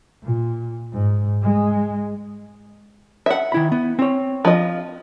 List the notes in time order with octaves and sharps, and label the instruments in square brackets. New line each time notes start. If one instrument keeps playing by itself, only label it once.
[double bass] A#2
G#2
G#3
[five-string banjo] E5 F#5
[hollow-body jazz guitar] D#3 E4 B5
B3
C4 C#5
[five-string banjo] F3 F4 D#5